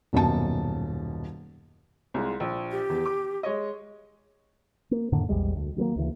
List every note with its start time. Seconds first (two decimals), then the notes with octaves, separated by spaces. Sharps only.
0.13 D#1 F#2 B2 A5
2.14 C2 G#3 F4
2.40 A#1
2.71 G4
2.90 E2
3.06 D6
3.43 G#3 C#5 D#5
4.91 A#3
5.12 F2 A2 D3 D#3
5.29 A#1 E2 G3 G#3
5.56 D2
5.76 D#3 F#3 A3 A#3
5.96 D2 C#3 E3